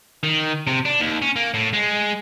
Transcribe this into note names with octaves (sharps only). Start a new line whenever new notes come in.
D#3
C3
D4
D#2
C#4
A#3
A2
G#3